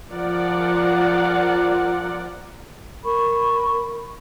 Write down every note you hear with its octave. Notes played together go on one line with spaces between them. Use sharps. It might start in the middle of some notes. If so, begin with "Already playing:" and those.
F3 F4 A#4 D5 F#5
A#4 B5 C#6